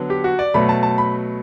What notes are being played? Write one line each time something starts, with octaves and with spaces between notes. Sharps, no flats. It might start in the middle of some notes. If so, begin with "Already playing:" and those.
Already playing: D3 F#3 B3
G4
F#4
D5
B2 F#3 A3 B5
A5
A5
B5